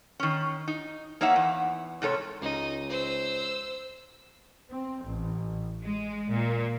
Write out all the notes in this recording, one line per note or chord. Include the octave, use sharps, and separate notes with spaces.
D#3 C#4
D#4
A#3 D#4 C#5 E5 F#5
E2
G#2 C3 A4 C#5
C#2 D#4
C5 E6
C4
A1
G#3
A#2